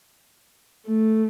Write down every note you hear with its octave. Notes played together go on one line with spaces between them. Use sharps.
A3